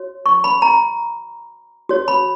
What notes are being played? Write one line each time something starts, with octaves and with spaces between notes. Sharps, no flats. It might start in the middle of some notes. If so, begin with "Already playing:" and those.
Already playing: F#4 C#5
C#6
B5
A#5
F#4 C#5
B5